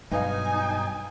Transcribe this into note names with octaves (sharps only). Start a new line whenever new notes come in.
G2 B2 F#3 D#4 B4 F5 G#5